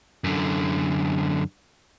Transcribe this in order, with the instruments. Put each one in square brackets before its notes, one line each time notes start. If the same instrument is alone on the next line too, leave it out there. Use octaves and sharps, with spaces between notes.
[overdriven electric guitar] F#2 D3